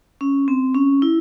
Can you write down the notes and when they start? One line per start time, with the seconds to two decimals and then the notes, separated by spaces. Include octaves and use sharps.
0.21 C#4
0.48 C4
0.75 C#4
1.02 E4